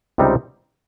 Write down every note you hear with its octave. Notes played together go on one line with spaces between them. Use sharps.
C#2 C3 G3 C4 D#4